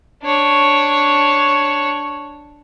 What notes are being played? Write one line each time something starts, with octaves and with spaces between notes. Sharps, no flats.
D4 C#5